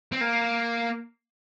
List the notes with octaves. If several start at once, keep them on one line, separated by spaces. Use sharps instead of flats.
C4
A#3